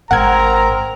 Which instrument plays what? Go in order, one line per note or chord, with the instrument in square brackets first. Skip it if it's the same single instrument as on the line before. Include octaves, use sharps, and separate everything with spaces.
[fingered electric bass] G#1 G#2 [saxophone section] C4 A#4 [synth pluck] F#5 G#6 [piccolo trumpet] A#5